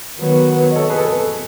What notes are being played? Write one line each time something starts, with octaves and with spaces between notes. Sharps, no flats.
D#3 F#3 B3
D#5
A4 C#5
G#4 B4
A4
G#4 B4
A4